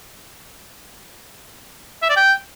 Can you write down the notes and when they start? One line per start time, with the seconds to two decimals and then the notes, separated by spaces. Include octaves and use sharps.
2.02 E5
2.09 D5
2.17 G5